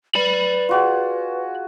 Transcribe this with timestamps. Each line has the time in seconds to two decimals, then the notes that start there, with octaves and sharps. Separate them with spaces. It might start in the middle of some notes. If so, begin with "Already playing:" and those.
0.15 B4 D5 B5
0.69 F4 F#4 G#4